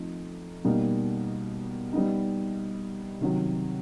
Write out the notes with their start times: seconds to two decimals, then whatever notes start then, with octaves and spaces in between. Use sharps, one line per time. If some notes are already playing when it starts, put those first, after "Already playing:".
Already playing: F3 A3 C4 D#4
0.65 B2 G3 A#3 D#4
1.93 G3 B3 D#4
3.21 C3 D#3 F#3